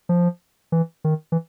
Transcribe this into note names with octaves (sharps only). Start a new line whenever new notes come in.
F3
E3
D#3
E3